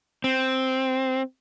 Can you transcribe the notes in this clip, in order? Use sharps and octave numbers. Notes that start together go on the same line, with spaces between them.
C4